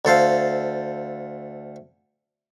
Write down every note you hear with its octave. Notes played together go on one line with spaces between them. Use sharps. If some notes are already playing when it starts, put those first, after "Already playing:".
D2 A4 C5 F5